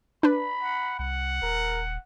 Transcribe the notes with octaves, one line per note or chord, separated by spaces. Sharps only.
D4 B4 B5
F#5
C2 F#5
D#1 A#4